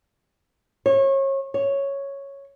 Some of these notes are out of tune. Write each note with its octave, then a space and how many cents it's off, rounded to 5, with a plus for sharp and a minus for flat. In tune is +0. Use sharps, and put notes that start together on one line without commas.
C#5 -30
C#5 +0